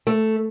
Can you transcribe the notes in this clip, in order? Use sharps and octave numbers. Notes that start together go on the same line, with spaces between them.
A3